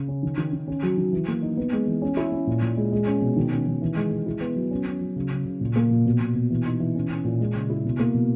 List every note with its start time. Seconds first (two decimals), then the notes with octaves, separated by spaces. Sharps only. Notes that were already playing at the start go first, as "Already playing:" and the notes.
Already playing: C#3
0.08 C#4
0.23 D#3
0.38 D#3
0.53 D#3
0.67 C#4
0.83 F#3
0.97 D#3
1.13 E3
1.27 A#3
1.42 D#4
1.57 B3
1.73 G#3
1.87 E3
2.02 C#4
2.17 E4
2.32 C#4
2.47 A#2
2.62 A#2
2.77 G#3
2.92 G#3
3.06 C#4
3.22 B2
3.37 D#3
3.52 C#4
3.66 D#3
3.81 E3
3.96 G#3
4.11 G#3
4.26 E4
4.41 B3
4.56 F#3
4.71 C#4
4.86 C#4
5.01 F#3
5.16 C#3
5.31 C#3
5.46 C#3
5.61 A#2
5.76 A#3
5.91 A#2
6.05 B2
6.20 B2
6.35 B2
6.50 E3
6.66 D#4
6.80 E3
6.95 C#4
7.10 C#4
7.25 A#2
7.40 G#3
7.55 C#3
7.70 E4
7.85 B2
7.99 A#3
8.14 B2